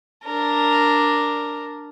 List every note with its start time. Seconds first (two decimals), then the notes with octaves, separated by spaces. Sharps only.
0.25 D4 A#4